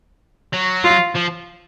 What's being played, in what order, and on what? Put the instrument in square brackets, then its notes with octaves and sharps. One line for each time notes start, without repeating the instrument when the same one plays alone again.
[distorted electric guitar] F#3
[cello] F4
[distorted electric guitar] F3